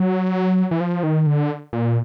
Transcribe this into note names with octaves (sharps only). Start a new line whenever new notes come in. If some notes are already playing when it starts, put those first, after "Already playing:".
Already playing: F#3
E3
F3
D#3
D3
A#2